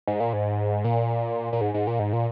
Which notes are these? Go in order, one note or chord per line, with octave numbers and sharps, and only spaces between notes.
G#2
A#2
G#2
A#2
A#2
G#2
G#2
A#2
G#2
A#2